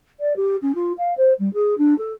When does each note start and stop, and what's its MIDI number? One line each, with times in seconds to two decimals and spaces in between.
0.20 0.35 74
0.36 0.56 67
0.62 0.72 61
0.75 0.92 65
0.98 1.13 77
1.17 1.33 72
1.39 1.51 55
1.53 1.77 68
1.78 1.96 62
1.98 2.13 69